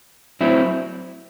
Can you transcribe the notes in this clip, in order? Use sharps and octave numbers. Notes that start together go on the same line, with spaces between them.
F#3 C4 E4